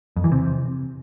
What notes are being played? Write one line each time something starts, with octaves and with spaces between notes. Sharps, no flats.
F2
E3
C3